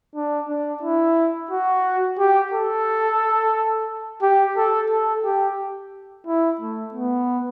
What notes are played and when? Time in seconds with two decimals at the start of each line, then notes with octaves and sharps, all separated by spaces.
0.15 D4
0.49 D4
0.82 E4
1.51 F#4
2.19 G4
2.53 A4
4.22 G4
4.57 A4
4.90 A4
5.25 G4
6.27 E4
6.61 A3
6.94 B3